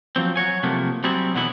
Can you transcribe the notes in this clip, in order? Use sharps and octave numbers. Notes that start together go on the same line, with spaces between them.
F3 F#3 C4
F#3 F#4 C#5 G#5
C3 F3 F#3 A3 A#3
F#3 G3 C4 E4 G#4
B2 D3 E3 F#3 B3 E4